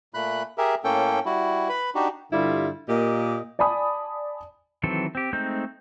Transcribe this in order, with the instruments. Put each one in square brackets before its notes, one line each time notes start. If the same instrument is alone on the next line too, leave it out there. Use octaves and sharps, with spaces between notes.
[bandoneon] A#2 A3 B5 F#6
G4 G#4 A#4 E5
A2 A#3 C#4 A4 G5
G3 E4 F#4
B4 B5
D4 D#4 F#4 G4
[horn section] G2 D3 G3 E4 F4
A#2 A#3 G4 D#5
[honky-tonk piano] D5 G#5 A5 B5 D#6
[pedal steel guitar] D#3 E3 F#3 C4 A4
C4 G4
G#3 A3 C4 D#4 G6